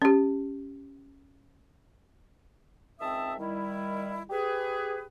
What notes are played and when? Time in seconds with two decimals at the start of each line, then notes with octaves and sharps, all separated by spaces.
0.02 C#4 G4
3.00 C#2 D#3 C4 E5 A5 D#6
3.39 D#3 G3 E4
4.30 G4 G#4 B4